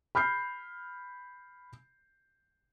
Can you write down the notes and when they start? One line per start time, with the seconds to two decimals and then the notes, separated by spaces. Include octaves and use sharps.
0.15 B5 F6 G6 C7